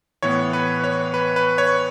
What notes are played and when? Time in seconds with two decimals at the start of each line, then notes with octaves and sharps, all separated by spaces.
0.22 A2 E3 B3 C#5
0.53 B4
0.84 C#5
1.14 B4
1.36 B4
1.58 C#5